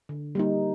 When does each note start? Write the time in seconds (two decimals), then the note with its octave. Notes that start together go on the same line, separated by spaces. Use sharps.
0.09 D3
0.35 G3 A#3 D#4